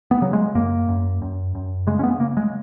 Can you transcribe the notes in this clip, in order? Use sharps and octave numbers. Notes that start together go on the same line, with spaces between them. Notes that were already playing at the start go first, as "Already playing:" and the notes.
B3
C#3 F#3
G#3
F#2 A#3
F#2
F#2
F#2
C#3 G#3
C#4
B3
C#3 A#3
G#3